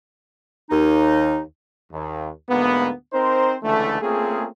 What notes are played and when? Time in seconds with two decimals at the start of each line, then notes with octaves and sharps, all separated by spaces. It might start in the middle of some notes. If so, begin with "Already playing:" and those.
0.70 D#2 D#4
1.93 D#2
2.50 D2 G#2 A#3 B3
3.13 C4 D#4 A#4 C5
3.63 C#2 D3 E3 A3
4.02 A3 A#3 C4 C#4 F4 G#4